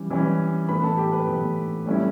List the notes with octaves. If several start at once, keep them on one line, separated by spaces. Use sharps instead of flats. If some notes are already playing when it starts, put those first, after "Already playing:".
Already playing: E3 G3 C#4
E3 G3 C#4
A2 E3 B3 B4 B5
A4 A5
G4 G5
B4 B5
A2 E3 B3
A2 G3 C#4 E4